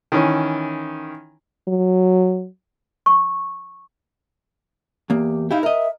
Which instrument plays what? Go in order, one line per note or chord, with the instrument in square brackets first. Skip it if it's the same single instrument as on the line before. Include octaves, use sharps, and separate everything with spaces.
[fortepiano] D#3 E3 C#4
[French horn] F#3
[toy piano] C#6
[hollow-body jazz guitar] E2 A#3 [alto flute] G4
[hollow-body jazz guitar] D#4 E4 G4 [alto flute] F5
[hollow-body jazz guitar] A#4 D#5 [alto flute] E5